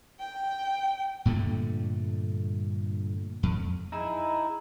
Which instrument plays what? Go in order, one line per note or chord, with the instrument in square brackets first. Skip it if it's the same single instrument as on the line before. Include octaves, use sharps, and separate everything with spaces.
[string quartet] G5
[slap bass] G2 A#2 D3 A3
F2
[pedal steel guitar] D#4 E4 G#4